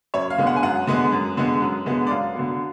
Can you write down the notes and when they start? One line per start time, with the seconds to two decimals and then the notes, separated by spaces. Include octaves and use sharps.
0.14 F#2 C#5
0.30 F5
0.38 D3 G#3 B3
0.47 F#5
0.56 G#5
0.63 F#2 F#5
0.87 D3 G#3 B3
1.12 F#2
1.37 D3 G#3 B3
1.62 F#2
1.86 D3 G#3 B3
2.07 D5
2.11 F#2 F5
2.35 D3 F#3 B3